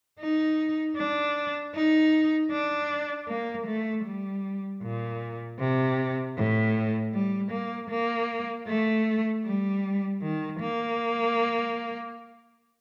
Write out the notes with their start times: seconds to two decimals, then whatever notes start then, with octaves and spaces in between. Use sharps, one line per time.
0.21 D#4
0.97 D4
1.75 D#4
2.51 D4
3.28 A#3
3.67 A3
4.05 G3
4.82 A#2
5.60 C3
6.37 A2
7.14 G3
7.52 A#3
7.90 A#3
8.68 A3
9.45 G3
10.22 D#3
10.60 A#3